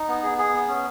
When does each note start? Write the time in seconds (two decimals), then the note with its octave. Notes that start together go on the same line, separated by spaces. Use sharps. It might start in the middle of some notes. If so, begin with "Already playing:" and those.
Already playing: D#4
0.08 B3
0.23 G#4
0.38 G#4
0.53 B3
0.68 C#4